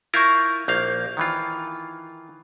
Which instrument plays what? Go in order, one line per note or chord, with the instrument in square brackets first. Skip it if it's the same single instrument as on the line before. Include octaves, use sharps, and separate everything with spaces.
[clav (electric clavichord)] E4 F4 A#4 [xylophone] C#6 G6 A#6
[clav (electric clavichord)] A#1 A#3 F5 [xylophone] G6
[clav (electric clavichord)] D#3 E3 F4